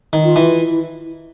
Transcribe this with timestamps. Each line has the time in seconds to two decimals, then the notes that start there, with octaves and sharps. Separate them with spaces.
0.13 D#3
0.24 F4
0.36 E3
0.59 E4